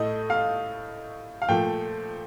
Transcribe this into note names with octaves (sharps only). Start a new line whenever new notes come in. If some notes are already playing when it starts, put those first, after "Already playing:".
Already playing: A2 A3 D#5
F5
F5
A#2 F3 A3 G5